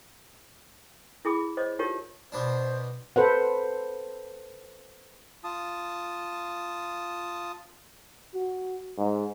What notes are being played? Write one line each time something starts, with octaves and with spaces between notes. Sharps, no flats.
E4 G#4 B5 D6
C5 C#5 D#5
D#4 F4 G4 A#4 C#5
B2 B3 D4 C5
A4 B4 C5 F#5
F4 A5 D#6
F#4
G#2